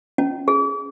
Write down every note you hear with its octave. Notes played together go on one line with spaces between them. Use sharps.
C#4
G#4